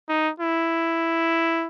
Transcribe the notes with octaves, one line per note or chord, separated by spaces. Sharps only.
D#4
E4